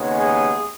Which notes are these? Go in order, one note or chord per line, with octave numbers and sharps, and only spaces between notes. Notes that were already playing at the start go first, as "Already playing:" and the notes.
Already playing: D#2 C#3 G#3 B3
G#4